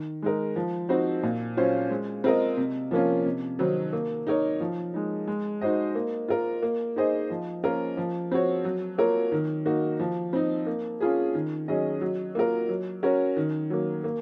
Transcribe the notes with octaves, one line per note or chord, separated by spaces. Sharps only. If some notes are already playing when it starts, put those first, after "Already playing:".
Already playing: D#3
G#3 D#4 A#4
F3
C4 D#4 F#4 C5
A#2
F#3 C#4 F4 C5
G#3
C4 F4 A#4 D#5
C3
F3 A#3 C#4 F4
C3
D#3 F#3 C4 D#4
A#3
D#4 A#4 C#5
F3
G#3 D#4
G#3
D#4 F#4 C5 D#5
A#3
F4 A#4
A#3
D#4 G#4 C5 D#5
F3
A#3 C#4 F4 A#4
F3
C4 F#4 C#5
F#3
A#3 F4 A#4 C#5
D#3
A#3 D#4 F#4
F3
C4 D#4
A#3
C#4 F4 G#4
D#3
F#3 C#4 G#4 D#5
F#3
A#3 F4 A#4
F#3
C#4 F#4 A#4 C#5
D#3
F#3 A#3
A#3